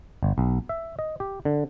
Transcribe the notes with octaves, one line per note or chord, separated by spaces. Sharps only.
G1
B1
E5
D#5
G4
D3